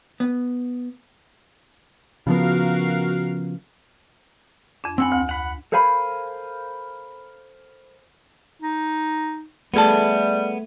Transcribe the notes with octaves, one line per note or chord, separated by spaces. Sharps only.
B3
C#3 F3 B3 F#4 A#4 F5
F2 D4
C4 F#5 G#5 B5 E6
D2
F#5 B5
A4 A#4 C5 F5 G#5 B5
D#4
G3 A3 B3 G#4 A5